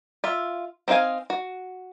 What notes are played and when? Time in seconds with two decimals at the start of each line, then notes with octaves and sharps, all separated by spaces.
0.24 F4 E5
0.88 C4 D#4 A4 F5 G#5
1.30 F#4